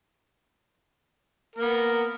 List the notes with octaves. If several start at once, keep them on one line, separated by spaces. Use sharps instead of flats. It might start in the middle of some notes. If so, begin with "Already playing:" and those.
A#3 B3 A#4